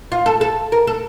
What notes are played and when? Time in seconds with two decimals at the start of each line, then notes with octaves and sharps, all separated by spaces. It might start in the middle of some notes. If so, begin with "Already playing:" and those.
0.12 F4
0.26 A4
0.41 A4
0.72 A#4
0.87 A4